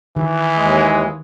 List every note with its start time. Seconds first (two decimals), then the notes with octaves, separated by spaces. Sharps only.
0.16 D#3 E3
0.58 D#2 G#3